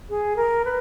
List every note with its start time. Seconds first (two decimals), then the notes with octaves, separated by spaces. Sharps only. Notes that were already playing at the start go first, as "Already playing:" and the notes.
0.10 G#4
0.36 A#4
0.65 B4